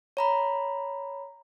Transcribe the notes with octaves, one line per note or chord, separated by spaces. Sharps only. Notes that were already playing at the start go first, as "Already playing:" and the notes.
C#5 A#5 B5